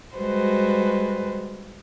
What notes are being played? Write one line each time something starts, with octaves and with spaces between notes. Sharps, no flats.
G3 G#3 F#4 B4 C5